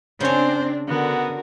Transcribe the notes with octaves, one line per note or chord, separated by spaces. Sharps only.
C#3 C4 D4 C5 C#5
D3 B3 F#4 A#4